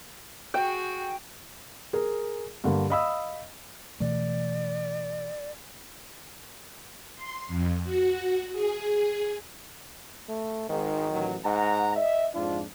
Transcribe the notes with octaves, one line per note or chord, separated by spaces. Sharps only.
F#4 G#4 G5
G#4 A#4
G2 D3 A#3
D#5 F5 B5 D#6 E6
B2 E3 A3 D5
C6
F2
F#4
G#4
A3
G#1 G#2 D#3
A1 F#3
G#2 F#5 A#5
D#5 E5
F2 G#2 D4 F4